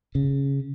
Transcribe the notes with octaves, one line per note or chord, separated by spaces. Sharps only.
C#3